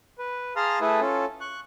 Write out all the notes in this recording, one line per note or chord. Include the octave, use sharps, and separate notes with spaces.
B4
G#4 F5 A5 A#5 C6 F6
A3 E4 G#4 A4 B4
C#4 F4 A4
C#6 F#6